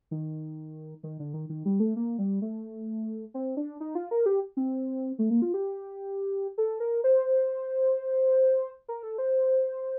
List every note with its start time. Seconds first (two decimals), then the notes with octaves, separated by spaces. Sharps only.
0.11 D#3
1.03 D#3
1.19 D3
1.34 D#3
1.49 D#3
1.65 G3
1.80 A3
1.96 A#3
2.18 G3
2.42 A3
3.34 C4
3.57 D4
3.80 D#4
3.95 F4
4.11 A#4
4.26 G4
4.57 C4
5.19 A3
5.30 A#3
5.42 F4
5.54 G4
6.58 A4
6.80 A#4
7.04 C5
8.88 A#4
9.03 A4
9.18 C5